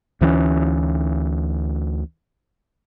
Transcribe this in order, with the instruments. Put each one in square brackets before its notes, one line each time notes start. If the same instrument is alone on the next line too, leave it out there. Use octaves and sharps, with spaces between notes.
[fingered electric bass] D2 E3 G3 C#4